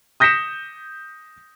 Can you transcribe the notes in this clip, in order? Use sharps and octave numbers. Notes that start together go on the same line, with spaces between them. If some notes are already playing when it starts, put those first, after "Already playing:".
D#6 G6 A#6 B6 C#7 E7